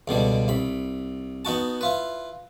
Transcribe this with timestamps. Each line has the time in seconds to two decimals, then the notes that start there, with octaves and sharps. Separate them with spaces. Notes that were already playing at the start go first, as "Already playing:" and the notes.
0.08 C#2 B2 D3 G3
0.48 C2 B5
1.45 B3 D#4 F#4 A5
1.81 E4 F4 B4